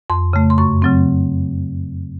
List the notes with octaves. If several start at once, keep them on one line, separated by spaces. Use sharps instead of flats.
F2 C6
C#3 A3
C6
F#2 C#6
C#3 F#3 C4